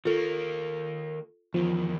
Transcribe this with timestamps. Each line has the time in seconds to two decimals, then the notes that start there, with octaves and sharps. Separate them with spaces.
0.05 D#3 A#3 F4 A4
1.54 E2 D#3 F3